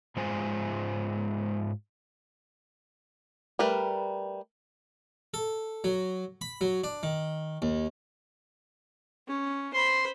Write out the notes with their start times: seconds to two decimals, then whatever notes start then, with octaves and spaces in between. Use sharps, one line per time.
0.17 G#2 G#3 F4 C5 G#5
3.59 G3 A3 A#4 B4
5.34 A4
5.84 F#3
6.41 B5
6.61 F#3
6.84 D4
7.03 D#3
7.62 D#2
9.28 C#4
9.74 C5 B5 C6